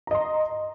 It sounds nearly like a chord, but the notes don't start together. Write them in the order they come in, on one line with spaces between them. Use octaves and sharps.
A#5 D#5 C6